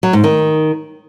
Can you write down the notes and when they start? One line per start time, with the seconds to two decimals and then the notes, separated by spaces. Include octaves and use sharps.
0.03 F#3
0.13 G#2
0.24 D#3